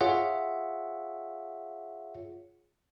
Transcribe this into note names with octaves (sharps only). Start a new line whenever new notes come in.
F4 G#4 C#5 E5 F#5